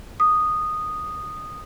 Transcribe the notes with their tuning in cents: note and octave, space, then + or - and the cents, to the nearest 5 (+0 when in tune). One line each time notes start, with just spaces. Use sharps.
D#6 -10